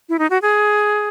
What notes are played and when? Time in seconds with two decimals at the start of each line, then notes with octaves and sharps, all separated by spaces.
0.09 E4
0.19 D#4
0.30 F#4
0.42 G#4